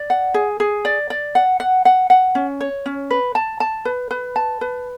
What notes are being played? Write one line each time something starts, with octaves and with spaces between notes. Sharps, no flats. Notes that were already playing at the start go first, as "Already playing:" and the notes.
Already playing: D5
F#5
G#4
G#4
D5
D5
F#5
F#5
F#5
F#5
C#4
C#5
C#4
B4
A5
A5
B4
B4
A5
B4